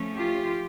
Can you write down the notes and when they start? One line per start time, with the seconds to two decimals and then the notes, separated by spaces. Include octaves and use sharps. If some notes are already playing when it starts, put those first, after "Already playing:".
Already playing: F3 A3 C#4
0.15 F4 G4